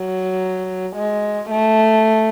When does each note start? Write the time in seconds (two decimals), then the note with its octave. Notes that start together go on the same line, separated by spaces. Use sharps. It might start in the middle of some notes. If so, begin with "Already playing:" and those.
Already playing: F#3
0.96 G#3
1.51 A3